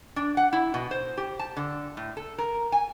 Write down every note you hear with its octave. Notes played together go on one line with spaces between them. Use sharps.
D4
F#5
E4
B2
C5
G4
A5
D3
A2
A4
A#4
G#5